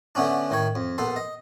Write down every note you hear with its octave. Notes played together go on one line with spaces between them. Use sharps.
D3 A3 B3 C#4 D4
A2 D#3 C#5
F2
A#1 B3 A4 C6
D#5